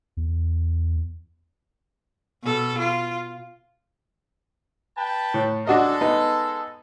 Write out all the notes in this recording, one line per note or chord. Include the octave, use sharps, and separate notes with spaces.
E2
B2 A4
F4
B4 G5 A5
A2
G#3 D4 F#4 A4 D#5
B3 D#4